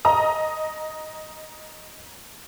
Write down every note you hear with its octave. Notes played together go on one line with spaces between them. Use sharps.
D#5 A#5 D#6